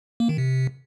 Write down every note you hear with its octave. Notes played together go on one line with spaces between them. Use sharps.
A#3
D#3
C3